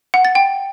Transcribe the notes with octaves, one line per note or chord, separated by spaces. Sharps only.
F#5
A6
G5